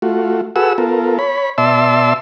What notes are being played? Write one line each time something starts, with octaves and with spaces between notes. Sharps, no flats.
A3 F4 F#4
F#4 G#4 A4 B4 F#5 E6
B3 F4 A4 A#4
C#5 B5
B2 D5 E5 A5 C6 E6